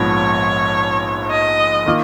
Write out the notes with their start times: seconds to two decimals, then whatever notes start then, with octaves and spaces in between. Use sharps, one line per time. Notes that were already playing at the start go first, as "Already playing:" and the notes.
Already playing: A#1 G#2 F3 B3 C#5
1.31 D#5
1.86 D#3 A#3 F4